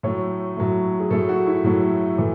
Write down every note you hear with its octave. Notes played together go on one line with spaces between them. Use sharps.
A2 F#3 A3 C#5
A2 F#3 A3
G#4
A2 F#3 A3 A4
F#4
E4
A2 F#3 A3
A2 E3 A3